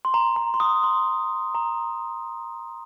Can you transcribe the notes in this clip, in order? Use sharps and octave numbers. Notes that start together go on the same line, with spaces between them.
C6
A#5
A#5
C6
D#6
C6
A#5